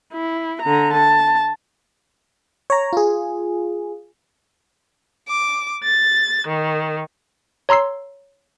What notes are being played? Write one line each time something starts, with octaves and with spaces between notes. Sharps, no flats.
E4
D3 A#5
A5
C#5 A#5
F4 G#4
D6
A6
D#3
C#5 A#5 C6 E6 C7